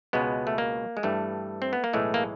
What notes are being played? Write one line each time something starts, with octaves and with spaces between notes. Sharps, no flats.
C#2 B2 G#3 B3
A3
A#3
G#3
G2 E3 G3 A3
C4
B3
A#3
B1 A2 E3 G#3 A3
A#3